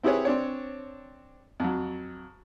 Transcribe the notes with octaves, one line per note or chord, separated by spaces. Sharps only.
C4 E4 G4 G#4 B4 C#5
C4 D4 C#5
F2 F#3